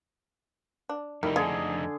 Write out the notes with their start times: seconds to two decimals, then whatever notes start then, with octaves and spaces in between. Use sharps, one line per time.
0.89 D4
1.23 F2 D#3 G3 A3 D#4 E4
1.36 D3 G#4 G#5